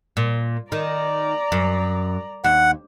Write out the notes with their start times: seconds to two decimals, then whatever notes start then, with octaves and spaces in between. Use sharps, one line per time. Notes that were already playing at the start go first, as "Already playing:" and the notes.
0.17 A#2
0.72 D#3 D5 A#5
1.52 F#2
2.44 D#2 F#5